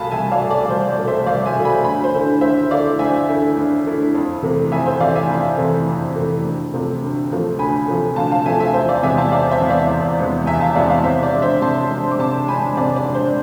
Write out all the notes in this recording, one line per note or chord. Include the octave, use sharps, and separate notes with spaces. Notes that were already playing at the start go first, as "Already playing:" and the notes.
Already playing: C2 B2 A3 F5 G#5 A5 B5
C2 E5 G#5
D5 F5
B2 A3
D5
C2 C5
D5
B2 A3
C5 E5
C2 D5 F5
E5 G#5
B2 A3
G#5 B5
D2 G#5 B5
C5
D3 A3 E4
D2 C5 E5
D3 A3 E4 D5 F5
D2 E5 G#5
D3 A3 E4
D2
D3 A3 E4
F2
C3 E3 A3
F2 E5 G#5
C5 E5
C3 E3 A3 D5 F5
E5 G#5
F2
C3 E3 A3
F2
C3 E3 A3
D2
C3 F3 A3
D2
C3 F3 A3
D2 G#5 B5
C3 F3 A3
D2 F5 A5
F5 A5
C3 F3 A3 E5 G#5
E5 G#5
E2 C5 E5
D5 F5
C3 E3 G#3 B3 E5 G#5
F5 A5
E2 D5 F5
C5 E5
C3 E3 G#3 B3
D5 F5
E2
C3 E3 G#3 B3
E2 E5 G#5
F5 A5
C3 E3 G#3 B3 D5 F5
D5 F5
C3 C5 E5
D5
G#3 D4
C5 E5
C3 A5 C6
G#3 D4
D6
C3 A5 C6
G#3 D4 G#5 B5
C3 D5
D5
G#3 D4
C5